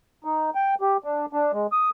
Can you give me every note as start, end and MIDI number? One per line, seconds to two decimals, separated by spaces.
0.24 0.50 63
0.55 0.75 79
0.81 0.97 67
1.04 1.26 62
1.33 1.52 62
1.53 1.67 56
1.72 1.90 87